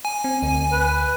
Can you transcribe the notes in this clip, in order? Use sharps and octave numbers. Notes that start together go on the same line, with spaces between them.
G#5
C4
D2
B4